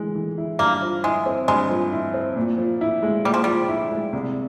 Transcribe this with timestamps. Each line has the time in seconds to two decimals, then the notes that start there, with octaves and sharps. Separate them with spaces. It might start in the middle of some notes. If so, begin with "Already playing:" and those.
Already playing: E3 G#3
0.15 E3
0.38 E4
0.59 G2 A#3
0.82 F3
1.04 G#3 E4
1.26 C4
1.48 G2 G#3
1.70 F3
1.92 E4
2.14 C4
2.36 A#2
2.58 F3
2.81 E4
3.03 G#3
3.25 A#2 G3
3.34 F3
3.44 F3 G3
3.69 E4
3.91 G#3
4.13 C2